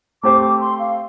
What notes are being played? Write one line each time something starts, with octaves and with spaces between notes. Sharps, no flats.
A3 C4 G4 C5 D6
D6
C6
F5